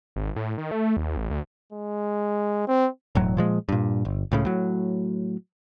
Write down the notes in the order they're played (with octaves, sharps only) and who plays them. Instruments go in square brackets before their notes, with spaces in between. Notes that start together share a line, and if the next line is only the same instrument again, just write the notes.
[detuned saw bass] G#1
A2
D#3
A3
D#2
A1
D2
[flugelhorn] G#3
C4
[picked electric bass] E1 A2 F#3
A#2 F3 G#3
G2 A#2
G1
C#2 A2 C#3
A2 F#3